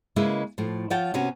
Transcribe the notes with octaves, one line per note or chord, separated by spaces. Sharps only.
C#3 G#3 A#3 D#4 E4 B4
A2 F3
F3 F4 C#5 F#5 G5 A5
C3 B3 C#4 F#4